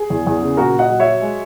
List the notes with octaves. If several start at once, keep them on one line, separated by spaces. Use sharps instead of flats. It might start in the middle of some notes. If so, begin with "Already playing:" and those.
Already playing: G#4
E2
E2
C#3
A#2 F#4 A#4
A#2
D#5 F#5
F#3
C#5 E5
F#3
G#3